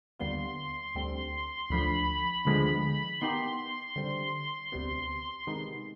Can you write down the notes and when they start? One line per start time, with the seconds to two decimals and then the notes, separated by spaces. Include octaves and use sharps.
0.19 D#2 D3 G3 B3 F4 C6
0.95 D2 D3 G3 C4
1.70 D2 D3 F3 B5
2.45 D2 D3 F3 G#3 B3 B5
3.21 D#3 B3 D#4 G4 C6
3.96 D3 G3 C4
4.72 D2 C3 G3 B3
5.47 C3 D#3 G#3 B3 D#4